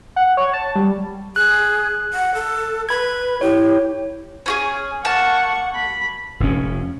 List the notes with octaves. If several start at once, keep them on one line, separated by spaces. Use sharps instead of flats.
F#5
C#5
A5
G3
G#4 F#6
F#5
A4
B4 B5 G#6
E4 G4 C#5
C#4 F#4 G#4
A#3 F#5 A5 C#6
B5
F1 F2 C#4